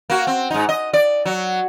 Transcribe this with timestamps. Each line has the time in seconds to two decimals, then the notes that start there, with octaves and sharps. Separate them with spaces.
0.10 A#3 F#4
0.27 C4
0.51 G#2 D#4
0.69 D#5
0.93 D5
1.25 F#3